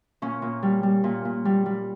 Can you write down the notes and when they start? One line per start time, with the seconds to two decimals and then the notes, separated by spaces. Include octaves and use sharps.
0.22 A#2 C#4
0.42 A#2
0.63 G3
0.83 G3
1.04 A#2
1.25 A#2
1.45 G3
1.66 G3